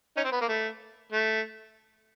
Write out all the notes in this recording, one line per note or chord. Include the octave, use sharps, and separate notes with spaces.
C#4 D#4
C4
B3
A#3
A3
A3